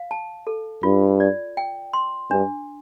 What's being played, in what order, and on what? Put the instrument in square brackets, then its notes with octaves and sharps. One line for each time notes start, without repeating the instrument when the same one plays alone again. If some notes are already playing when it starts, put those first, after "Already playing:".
Already playing: [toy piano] F5
A5
A4
[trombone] G2 [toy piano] F4
[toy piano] D5
G5
C6
[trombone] G2 [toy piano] D4